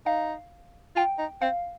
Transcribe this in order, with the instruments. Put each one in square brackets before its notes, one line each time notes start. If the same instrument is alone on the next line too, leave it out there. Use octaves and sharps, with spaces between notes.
[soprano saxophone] D#4 [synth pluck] F5
[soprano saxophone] F4 [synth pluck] G5
[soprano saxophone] D#4
[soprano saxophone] C4 [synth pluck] F5